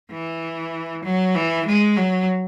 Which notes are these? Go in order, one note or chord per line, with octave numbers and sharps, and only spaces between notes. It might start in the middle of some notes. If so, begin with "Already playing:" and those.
E3
F#3
E3
G#3
F#3